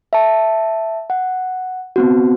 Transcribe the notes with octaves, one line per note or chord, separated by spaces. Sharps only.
E5 A5
F#5
B3 C4 F#4